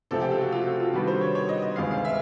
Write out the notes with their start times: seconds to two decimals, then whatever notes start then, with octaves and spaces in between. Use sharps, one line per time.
0.11 C#2 C3 F3 A3 C4 A4
0.22 G4
0.32 F4
0.41 F#4
0.52 F4
0.66 F#4
0.80 F4
0.93 C3 D#3 G3 B3 D4 F#4
1.07 C5
1.21 C#5
1.35 C#5
1.49 D#5
1.62 D#5
1.76 D2 C3 D#3 G#3 B3 F5
1.91 F5
2.05 E5